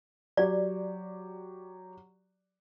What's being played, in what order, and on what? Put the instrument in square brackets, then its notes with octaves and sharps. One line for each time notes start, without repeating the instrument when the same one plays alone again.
[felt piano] F#3 G4 [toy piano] D5